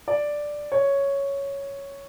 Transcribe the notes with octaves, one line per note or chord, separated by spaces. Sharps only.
D5
C#5